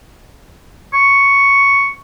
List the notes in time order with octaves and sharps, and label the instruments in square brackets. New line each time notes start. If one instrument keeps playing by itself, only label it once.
[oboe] C#6